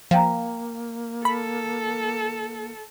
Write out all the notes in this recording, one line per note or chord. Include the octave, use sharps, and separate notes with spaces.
F3 A#3 F5 G5 A#5
A4 B5